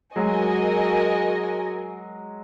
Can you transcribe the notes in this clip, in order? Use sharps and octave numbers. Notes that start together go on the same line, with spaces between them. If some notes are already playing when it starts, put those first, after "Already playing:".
F#3 G#3 F#4 A#4 D#5 G#5